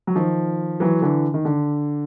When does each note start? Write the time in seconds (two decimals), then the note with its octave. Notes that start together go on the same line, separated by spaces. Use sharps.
0.07 F#3
0.15 D#3 F3
0.80 E3 F#3
1.02 D3 E3
1.34 D#3
1.45 D3